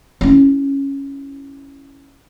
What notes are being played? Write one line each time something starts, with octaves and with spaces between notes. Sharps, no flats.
C#4 E4